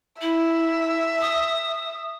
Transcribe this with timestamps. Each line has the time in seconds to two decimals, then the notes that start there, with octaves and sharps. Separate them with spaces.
0.21 E4 E5
1.21 D#6